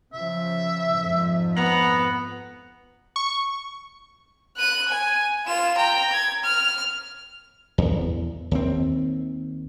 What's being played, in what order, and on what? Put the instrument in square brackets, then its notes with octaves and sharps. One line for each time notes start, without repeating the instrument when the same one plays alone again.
[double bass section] C#3 F3 [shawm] E5
[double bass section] F2 G#2 F3
[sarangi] B3 [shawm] A#5
[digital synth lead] C#6
[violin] F#6 D#7
G#5
F4 E7
G5 A#5
G#6
F6
[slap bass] E2
D#2 C4